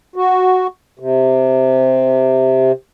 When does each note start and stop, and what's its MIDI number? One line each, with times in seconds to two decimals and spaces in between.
0.16 0.67 66
0.99 2.72 48